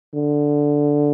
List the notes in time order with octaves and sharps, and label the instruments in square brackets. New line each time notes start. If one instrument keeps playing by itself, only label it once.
[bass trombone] D3